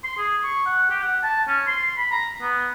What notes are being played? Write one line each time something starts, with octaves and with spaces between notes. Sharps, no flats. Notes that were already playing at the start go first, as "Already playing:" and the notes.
C6
G#4
C#6
F#5
G4
F#5
A5
C#4
C6
B5
A#5
B3